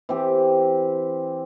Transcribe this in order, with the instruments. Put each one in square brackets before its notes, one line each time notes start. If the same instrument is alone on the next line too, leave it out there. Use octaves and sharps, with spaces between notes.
[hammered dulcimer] E3 C4 G4